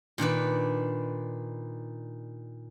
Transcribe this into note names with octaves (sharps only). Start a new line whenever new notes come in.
A#2 D#3 D4 B4